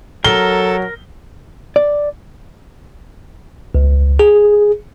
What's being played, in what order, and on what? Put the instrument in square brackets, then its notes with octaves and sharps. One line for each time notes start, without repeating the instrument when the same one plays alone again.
[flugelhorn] F#3 [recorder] A4 [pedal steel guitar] A#4 [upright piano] G7
[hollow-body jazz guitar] D5
[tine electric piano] C#2
G#4